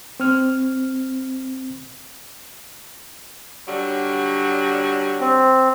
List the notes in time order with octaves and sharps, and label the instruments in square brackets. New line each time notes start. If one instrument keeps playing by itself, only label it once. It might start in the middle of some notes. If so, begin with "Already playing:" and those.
[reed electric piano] C4 F6
[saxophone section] D3 F#3 G3
[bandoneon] C4